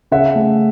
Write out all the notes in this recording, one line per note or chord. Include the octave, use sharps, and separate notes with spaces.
C#3 E5 F#5
A3